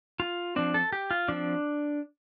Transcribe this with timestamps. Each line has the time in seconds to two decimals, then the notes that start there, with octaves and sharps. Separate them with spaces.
0.20 F4
0.56 F3 C4 D4
0.74 A4
0.93 G4
1.11 F4
1.28 F3 C4 D4